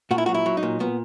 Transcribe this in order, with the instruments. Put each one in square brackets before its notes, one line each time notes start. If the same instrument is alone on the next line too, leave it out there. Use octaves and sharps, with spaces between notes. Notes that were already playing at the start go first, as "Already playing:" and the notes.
[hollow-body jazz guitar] A#2 F#4
E4
F#4
F#3
E4
F#3
D#4
A#2
A#2 B3